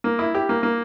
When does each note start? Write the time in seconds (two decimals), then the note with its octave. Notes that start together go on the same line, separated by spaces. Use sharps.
0.04 A#3
0.19 E4
0.35 G4
0.49 A#3
0.63 A#3